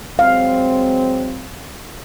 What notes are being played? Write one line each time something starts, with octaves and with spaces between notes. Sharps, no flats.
F#3 G#3 C4 F5